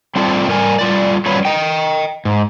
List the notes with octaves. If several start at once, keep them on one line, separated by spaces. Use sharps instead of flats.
G3 A3 C4 D4 F4 A4
G3 A#4 G#5
G3 F4 D5
F#3 G3 C#4 F4 B4 C#5
D#5 G5
G#2